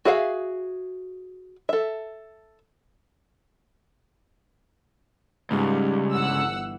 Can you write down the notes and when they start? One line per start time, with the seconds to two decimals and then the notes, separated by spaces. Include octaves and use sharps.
0.05 F#4 G#4 E5 F5
1.69 A4 E5
5.51 C#2 G#2 C#3 G3
6.13 G1 G2 E3 F#5 E6